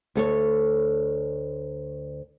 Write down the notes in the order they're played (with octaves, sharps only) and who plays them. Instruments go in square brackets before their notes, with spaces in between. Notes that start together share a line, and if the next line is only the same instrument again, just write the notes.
[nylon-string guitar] D2 A4 C#5